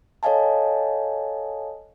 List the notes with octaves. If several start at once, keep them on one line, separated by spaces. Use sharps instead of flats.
A4 C#5 D#5 F5 G#5 A5